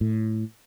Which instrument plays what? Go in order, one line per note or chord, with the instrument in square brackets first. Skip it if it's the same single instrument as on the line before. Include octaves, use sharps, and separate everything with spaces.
[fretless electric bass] A2